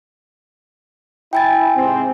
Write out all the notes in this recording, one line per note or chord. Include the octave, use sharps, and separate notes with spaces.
E4 G5 G#5 A6
G#2 C3 C4